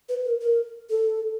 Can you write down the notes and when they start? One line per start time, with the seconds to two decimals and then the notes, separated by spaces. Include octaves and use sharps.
0.09 B4
0.25 A#4
0.41 A#4
0.89 A4